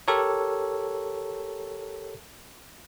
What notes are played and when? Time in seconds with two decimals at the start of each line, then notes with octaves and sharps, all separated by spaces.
0.08 G4 A4 A#4 C#5